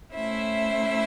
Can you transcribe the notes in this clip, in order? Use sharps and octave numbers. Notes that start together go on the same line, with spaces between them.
A3 C#4 E4 C5 E5